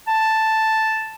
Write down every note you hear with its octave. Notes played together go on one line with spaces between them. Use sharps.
A5